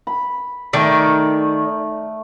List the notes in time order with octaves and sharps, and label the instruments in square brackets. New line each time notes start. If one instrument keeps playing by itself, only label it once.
[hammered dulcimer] B5
[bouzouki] D#3 D5 [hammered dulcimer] A3